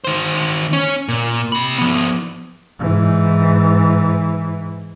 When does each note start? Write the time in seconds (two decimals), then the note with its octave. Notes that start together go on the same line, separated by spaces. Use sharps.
0.04 D#3 C5
0.73 C#4
1.08 A#2
1.52 C3 B5
1.78 F3 B3
2.78 G#2 E3